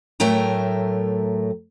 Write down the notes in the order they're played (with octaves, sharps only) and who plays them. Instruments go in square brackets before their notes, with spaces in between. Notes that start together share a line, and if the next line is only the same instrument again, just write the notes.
[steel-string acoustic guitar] A2 F#3 A3 A#4 G5 A#5